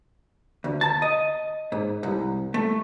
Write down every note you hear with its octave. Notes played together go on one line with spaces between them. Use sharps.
D2
A5
D#5
G#2
C2
A3